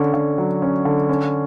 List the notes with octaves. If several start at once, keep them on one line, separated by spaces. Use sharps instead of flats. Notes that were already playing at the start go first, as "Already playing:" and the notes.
Already playing: D3 C#4
D3
F#3
C#4
D3
C#4